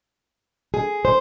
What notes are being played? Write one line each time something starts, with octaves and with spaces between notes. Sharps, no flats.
G#4
C5